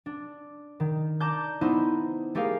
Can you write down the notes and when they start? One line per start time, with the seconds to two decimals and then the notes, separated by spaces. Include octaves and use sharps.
0.06 D4
0.80 D#3
1.20 D5 A5 A#5 D6 G6
1.61 B3 D#4 E4 C5
2.35 A3 G4 G#4 A#4 F5